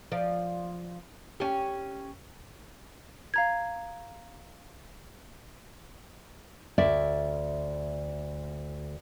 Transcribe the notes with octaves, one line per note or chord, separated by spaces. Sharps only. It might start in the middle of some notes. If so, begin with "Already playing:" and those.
F3 D5
C#4 G4
F5 A#5 G#6
D2 D5 E5